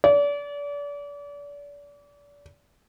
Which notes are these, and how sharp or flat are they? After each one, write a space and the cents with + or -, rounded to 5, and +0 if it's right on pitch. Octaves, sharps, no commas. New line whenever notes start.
D5 -35